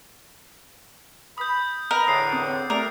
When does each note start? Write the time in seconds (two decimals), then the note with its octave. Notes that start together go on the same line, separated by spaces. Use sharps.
1.38 B5 D#6 G6
1.91 A#4 B4 D#5 B5
2.07 E2 A2 D3 D#6 C7
2.33 C4 D#6
2.70 G3 A3 D4 A#4